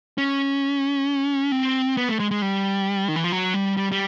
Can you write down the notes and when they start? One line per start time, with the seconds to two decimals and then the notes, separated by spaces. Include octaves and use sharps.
0.18 C#4
1.52 C4
1.97 B3
2.09 A3
2.20 G#3
2.31 G#3
2.42 G3
3.08 D#3
3.16 E3
3.24 F3
3.32 F#3
3.54 G3
3.77 G3
3.92 G3